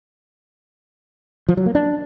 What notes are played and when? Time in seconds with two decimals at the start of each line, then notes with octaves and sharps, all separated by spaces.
1.49 F3
1.57 F#3
1.66 A#3
1.75 D4